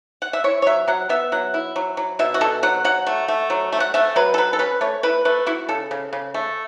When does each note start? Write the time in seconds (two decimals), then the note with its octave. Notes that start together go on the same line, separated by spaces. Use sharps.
0.22 F#5
0.33 E5
0.44 E4 C#5
0.62 C#5
0.66 F#3 E5
0.88 F#3 F#5
1.09 B3 E5
1.32 F#3 F#5
1.54 E4
1.76 F#3
1.97 F#3
2.19 B2 E5
2.34 F#4
2.41 B2 A4
2.63 F#3 F#5
2.84 F#3 F#5
3.07 A3
3.28 A3
3.50 F#3
3.72 A3
3.80 F#5
3.94 A3 E5
4.16 F#3 B4
4.34 A4
4.38 F#3 B4
4.53 A4
4.59 C#4 B4
4.81 A3 C#5
5.03 E4 B4
5.25 A3 B4
5.47 E4 F#4
5.69 C#3 A4
5.91 C#3
6.13 C#3
6.34 A3